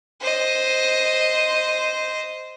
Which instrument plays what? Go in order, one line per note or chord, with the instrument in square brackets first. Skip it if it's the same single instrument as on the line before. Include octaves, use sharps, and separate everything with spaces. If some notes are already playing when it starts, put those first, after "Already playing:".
[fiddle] C5 D#5